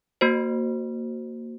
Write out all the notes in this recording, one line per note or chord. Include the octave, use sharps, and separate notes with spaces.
A#3 F#4 C5